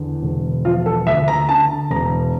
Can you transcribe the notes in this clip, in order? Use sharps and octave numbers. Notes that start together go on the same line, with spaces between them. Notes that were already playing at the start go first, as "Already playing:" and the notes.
Already playing: E2 D3
E1
F3 F4
A4
D2 E5
A#5
D3 A5
E1 A#5